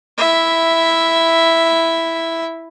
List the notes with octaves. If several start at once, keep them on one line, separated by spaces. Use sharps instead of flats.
E4 E5